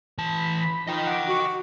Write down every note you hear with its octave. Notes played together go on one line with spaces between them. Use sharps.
E3 A5 B5
F3 D#4 D#5 G5
F#5 D6
F#4